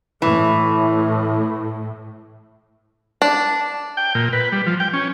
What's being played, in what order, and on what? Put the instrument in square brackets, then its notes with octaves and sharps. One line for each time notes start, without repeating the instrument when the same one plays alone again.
[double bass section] A2 [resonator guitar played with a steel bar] E3
[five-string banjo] D4
[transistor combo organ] G5
A#2
B4
G3
F3
G5
C#4